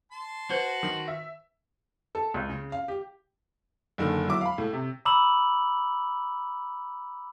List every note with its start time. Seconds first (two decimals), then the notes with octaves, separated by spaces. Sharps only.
0.12 A5 C6
0.50 F#4 B4 C5
0.83 D#3
1.08 E5
2.15 A4
2.34 C#2
2.49 C#3
2.72 F5
2.88 G4
3.98 F#1 D3 D#3
4.27 F#3 E4 D6
4.41 F5 B5
4.58 A2
4.73 C3
5.05 A#5 B5 D6 E6 F#7